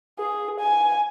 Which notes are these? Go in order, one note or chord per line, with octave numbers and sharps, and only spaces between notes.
G#4
G#5